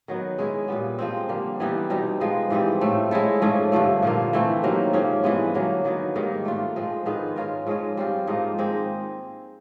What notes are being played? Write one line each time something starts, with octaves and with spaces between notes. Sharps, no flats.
D#3 F#3 B3
G#3 C#4 E4 G#4
A#2 G3 B3
F3 G#3 C4
D3 G3 A#3
E3 G3 B3 D#4
B2 G3 C4 D#4
F3 G#3 B3
G#2 E3 G3 C4
A2 F3 A3
G#3 C#4 E4 A4
G#2 F3 A3 C#4
G2 D3 F3 A3
A#2 F3 A#3
E3 A3 C4
C3 D#3 F#3 A#3
G#2 F3 A#3 C#4
G2 E3 G#3 B3
D3 F#3 A#3
D#3 F#3 B3
G#2 D#3 G3 A#3
A3 D4 F4
F3 G#3 C4
G#2 D#3 G#3 B3
G#3 C#4 F4 A#4
G#2 F3 G#3 C#4
G3 C4 F4
G#2 F3 A#3 D#4
D#3 G#3 C4